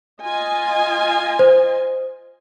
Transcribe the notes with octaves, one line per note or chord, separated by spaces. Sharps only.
F4 D#5 G#5
C5